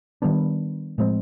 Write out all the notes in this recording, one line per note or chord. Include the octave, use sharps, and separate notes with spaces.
D#3 G3 B3 D4
A2 F3 G#3 C4